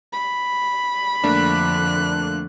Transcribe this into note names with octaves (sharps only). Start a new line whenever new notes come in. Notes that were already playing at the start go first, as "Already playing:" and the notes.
B5
F2 D3 A3 A#3 D4 F#6